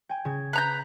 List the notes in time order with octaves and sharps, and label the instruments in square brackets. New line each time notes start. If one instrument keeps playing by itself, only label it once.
[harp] G5 G#5
C#3 G#6
[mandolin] B4 A#5 G6